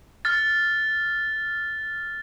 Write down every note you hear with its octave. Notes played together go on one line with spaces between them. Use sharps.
F6 A6